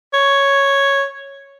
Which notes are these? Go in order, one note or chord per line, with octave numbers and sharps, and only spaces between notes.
C#5